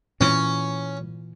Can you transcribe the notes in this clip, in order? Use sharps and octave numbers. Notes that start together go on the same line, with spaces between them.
A#2 E3 C#4